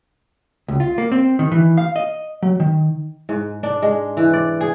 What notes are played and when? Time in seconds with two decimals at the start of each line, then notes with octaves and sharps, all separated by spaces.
0.68 C#2
0.80 F4
0.98 A#3
1.12 C4
1.39 D#3
1.52 E3
1.77 F5
1.96 D#5
2.42 F#3
2.60 D#3
3.29 G#2
3.63 D4
3.82 G#3
4.17 E3
4.33 D5
4.61 G#4